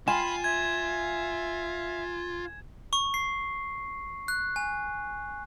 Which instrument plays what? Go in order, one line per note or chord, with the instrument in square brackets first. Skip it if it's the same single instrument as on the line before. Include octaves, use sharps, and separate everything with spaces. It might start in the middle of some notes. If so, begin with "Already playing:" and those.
[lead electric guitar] F4 [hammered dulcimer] G#5 C6 [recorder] B5 [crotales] E7
[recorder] E5 [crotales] G#6
[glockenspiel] C#6
C7
F#6
G#5